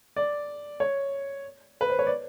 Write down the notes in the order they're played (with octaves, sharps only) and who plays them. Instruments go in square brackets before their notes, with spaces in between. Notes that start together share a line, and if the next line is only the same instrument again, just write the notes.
[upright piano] D5
C#5
B4
C5
C#5
D5